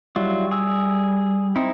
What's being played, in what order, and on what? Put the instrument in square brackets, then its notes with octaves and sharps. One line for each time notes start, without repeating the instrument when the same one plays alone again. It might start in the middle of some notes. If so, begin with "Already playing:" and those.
[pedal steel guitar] F#3 E4 F4 [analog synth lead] G3
[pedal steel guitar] G#4 E6
[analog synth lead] C4 [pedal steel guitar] D#4 E4